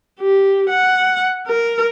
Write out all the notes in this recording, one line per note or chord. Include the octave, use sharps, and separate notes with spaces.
G4
F#5
A#4